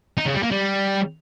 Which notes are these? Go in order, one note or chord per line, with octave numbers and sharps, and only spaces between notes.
D#4
C#3
G3
A#3
G3